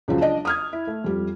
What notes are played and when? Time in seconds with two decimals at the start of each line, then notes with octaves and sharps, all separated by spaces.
0.08 C#2 C#3 F3 F#3
0.21 D4 D5 D#5
0.45 D#6 F6 G#6
0.73 E4
0.87 A3
1.04 F2 G3